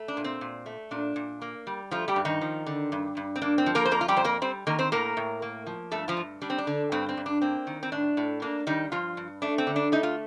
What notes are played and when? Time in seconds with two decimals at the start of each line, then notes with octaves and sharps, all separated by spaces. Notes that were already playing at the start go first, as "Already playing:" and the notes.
Already playing: A3
0.08 D4
0.17 A#2
0.24 C4
0.41 A#2
0.66 A3
0.91 A#2 D4
1.16 A#2
1.42 A#3
1.67 G3
1.91 F3 A3 F4
2.08 G3 G4
2.16 G2
2.25 D#3 D#4
2.41 F3
2.66 D3
2.92 G2
3.17 G2
3.36 C4
3.42 A#3 D4
3.58 C4
3.66 F3
3.75 A#3 A#4
3.86 C5
3.91 F2 A#3 A#4
4.01 F4
4.08 G3 G4
4.17 F2 C5
4.24 A#3 A#4
4.42 G3 C4 C5
4.67 D#3 A#3 A#4
4.79 C4 C5
4.92 A2 A#3 A#4
5.17 A2
5.42 A#3
5.67 F3
5.92 G2 A3 A4
6.08 F3 F4
6.17 G2
6.42 G3 D4
6.50 C4
6.58 D4
6.67 D3
6.92 G2 C4
7.09 C4
7.17 G2
7.26 D4
7.42 A#3 C4
7.67 D#3
7.83 C4
7.92 A2 D4
8.17 A2
8.42 A#3 D4
8.67 D#3 G3 D#4
8.92 G2 F3 F4
9.17 G2
9.42 A3 D4
9.58 C4
9.67 D3
9.76 D4
9.92 A3 D#4
10.03 F4